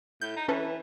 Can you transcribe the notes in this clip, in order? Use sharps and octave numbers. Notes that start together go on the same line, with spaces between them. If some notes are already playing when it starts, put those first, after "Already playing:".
A2 G6
D#4
E3 C#4 A4 B4